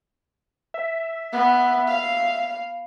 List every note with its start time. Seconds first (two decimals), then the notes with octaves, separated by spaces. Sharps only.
0.74 E5
1.33 B3
1.88 F5